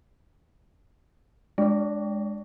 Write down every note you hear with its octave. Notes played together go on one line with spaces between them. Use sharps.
G#3 D4